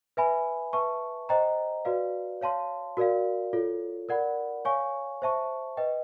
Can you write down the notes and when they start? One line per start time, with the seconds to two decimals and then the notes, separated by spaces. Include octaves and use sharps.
0.17 B4 E5 G#5 B5
0.73 B4 E5 A5 C#6
1.29 C5 D#5 G5 A#5
1.85 F#4 B4 D5 F5
2.41 C#5 F5 A5 C6
2.97 F#4 A#4 D5 F5
3.53 F4 A4 C#5
4.09 A#4 D5 F#5 B5
4.65 C#5 F5 G#5 C#6
5.22 C5 E5 A5 C#6
5.77 B4 D#5 G5